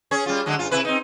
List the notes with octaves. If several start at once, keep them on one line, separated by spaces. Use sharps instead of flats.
C#4 G#4 C#5
G3 F4
D3 F#3 G#3
G2 F4
C3 E4 B4
C4 D#4